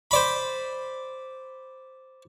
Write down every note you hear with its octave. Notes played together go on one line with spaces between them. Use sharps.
C5 D5 B5